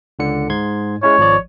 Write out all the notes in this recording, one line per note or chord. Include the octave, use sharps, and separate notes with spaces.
C#2 D3 C#7
G#2 C6 G#6
G#3 C#4 E4 C#5
G#1 F3 D5